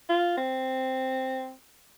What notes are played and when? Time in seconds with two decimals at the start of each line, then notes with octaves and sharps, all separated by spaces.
0.09 F4
0.38 C4